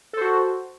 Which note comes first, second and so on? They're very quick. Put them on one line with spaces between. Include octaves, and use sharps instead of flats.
A4 C5 F#4